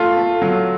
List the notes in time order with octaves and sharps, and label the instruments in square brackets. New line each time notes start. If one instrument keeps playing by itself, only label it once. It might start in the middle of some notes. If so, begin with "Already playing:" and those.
Already playing: [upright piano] A3 [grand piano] F4
[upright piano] A3
F#3